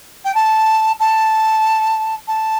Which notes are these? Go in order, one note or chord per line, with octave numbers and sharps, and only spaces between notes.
G5
A5
A5
A5